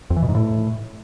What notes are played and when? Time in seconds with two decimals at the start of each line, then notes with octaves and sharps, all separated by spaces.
0.10 F2
0.16 E3
0.22 B2
0.29 G#2
0.35 A2